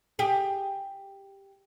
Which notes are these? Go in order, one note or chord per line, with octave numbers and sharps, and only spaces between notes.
G4 G#4